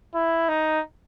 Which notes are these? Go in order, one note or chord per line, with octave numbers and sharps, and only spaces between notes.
E4
D#4